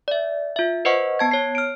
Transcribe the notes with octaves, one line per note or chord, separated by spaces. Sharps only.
D5 E5
F4 E5
B4 C5 D#5 F#5 C#6
B3 A5 G#6
C#5 C7
F6 D7